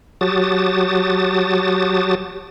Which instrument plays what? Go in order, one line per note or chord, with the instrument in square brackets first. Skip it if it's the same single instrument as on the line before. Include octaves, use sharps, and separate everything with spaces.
[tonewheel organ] F#3 F#4 G4 A5 D#6 A6